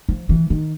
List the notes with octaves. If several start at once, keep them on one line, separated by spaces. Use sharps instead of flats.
F3
E3
D#3